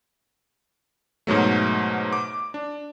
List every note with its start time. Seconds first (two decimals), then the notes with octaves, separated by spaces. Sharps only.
1.27 G#2 B2 F#3 A3
2.13 D6
2.54 D4